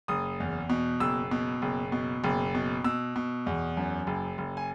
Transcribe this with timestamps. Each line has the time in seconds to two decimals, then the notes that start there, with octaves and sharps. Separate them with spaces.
0.08 F#1 D#6
0.40 E2
0.70 B2
1.00 F#1 E6
1.31 B2
1.62 F#1
1.92 B2
2.24 F#1
2.55 B2
2.84 B2 E6
3.16 B2
3.46 E2
3.77 F#2
4.07 F#1
4.38 F#1
4.57 G#5